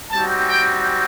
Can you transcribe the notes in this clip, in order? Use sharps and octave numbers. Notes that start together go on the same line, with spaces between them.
G3 C4 D#4 F#4 A5
G5